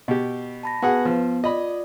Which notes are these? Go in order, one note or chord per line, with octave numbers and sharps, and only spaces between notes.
B2 G4
A5 B5 A#6
B3 F#4 G#4 B4 F#5
F3 B3
F4 D5 D#5 B5